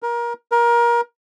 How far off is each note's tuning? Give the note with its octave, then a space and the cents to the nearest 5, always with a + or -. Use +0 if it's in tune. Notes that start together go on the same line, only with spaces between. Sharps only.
A#4 +25
A#4 +25